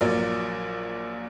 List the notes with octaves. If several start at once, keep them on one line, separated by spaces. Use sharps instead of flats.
A#1 A#2 F#3 A#3 D5